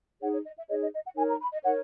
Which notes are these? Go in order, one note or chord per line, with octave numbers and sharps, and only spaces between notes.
D#4 G#4 C#5 F#5
C#5
D#5
E5
D#4 G#4 C#5 D#5
D#5
D#5
F#5
D#4 A#4 C#5 G#5
A#5
B5
D#5
D#4 A#4 C#5 F#5